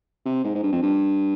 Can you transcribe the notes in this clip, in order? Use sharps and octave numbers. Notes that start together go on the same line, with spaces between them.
C3
G#2
G#2
G2
F2
G2